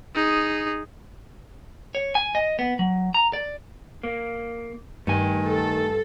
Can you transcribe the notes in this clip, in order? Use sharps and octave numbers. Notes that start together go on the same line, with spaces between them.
D#4 G#4
C#5
G#5
D#5
B3
F#3
A#5
D5
A#3
G2 D#3 A3 G#5
A4